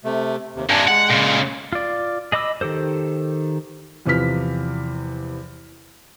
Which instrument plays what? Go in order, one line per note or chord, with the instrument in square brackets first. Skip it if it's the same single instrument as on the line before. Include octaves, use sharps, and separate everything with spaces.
[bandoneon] C3 A3
D#2 C3
[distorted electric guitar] G2 C3 [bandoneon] D4 G#5 A#5
[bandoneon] G#3 [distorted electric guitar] F#5
[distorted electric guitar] A#2 C#3
[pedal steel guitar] F4 D5
G#4 D#5 B5 D6 E6
D#3 G4 A4 C5
[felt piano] E2 C3 F3 B4 F6 B6